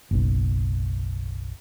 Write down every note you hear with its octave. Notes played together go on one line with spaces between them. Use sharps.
F#1 B1